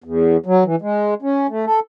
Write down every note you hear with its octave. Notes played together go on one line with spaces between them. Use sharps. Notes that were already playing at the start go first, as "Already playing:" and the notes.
E2
F#3
E3
G#3
C#4
A3
A4